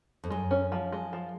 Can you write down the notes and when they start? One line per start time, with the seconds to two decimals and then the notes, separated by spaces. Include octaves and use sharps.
0.24 F2
0.30 F#2 G#3
0.51 C#4
0.72 F3
0.92 G#3
1.13 F3